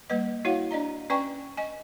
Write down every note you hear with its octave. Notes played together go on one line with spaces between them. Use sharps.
G3 A#3 B4 D#5
E4 F#4 C#5 F5 F#5
D4 D5 D#5 A#5
C#4 B4 D5 G5 G#5 C#6
D#5 G#5